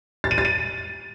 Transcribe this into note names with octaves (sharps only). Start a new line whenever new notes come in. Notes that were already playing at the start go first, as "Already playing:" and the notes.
A6
D#7
A6
D#7